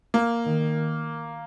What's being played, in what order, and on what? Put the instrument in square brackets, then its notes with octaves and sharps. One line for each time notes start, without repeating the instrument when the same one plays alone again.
[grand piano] A#3
[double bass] D#3